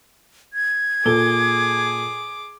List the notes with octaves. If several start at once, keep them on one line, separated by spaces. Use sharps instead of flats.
G#6
A#2 G#4 A4 D6 G7